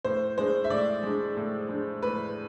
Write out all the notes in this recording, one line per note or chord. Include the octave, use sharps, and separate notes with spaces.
A2 C5
G#3 D4 C5
E5
A2 D5
G#3 D4
A2
G#3 D4
A2 B4